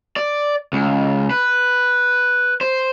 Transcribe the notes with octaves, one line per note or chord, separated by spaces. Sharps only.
D5
C#2
B4
C5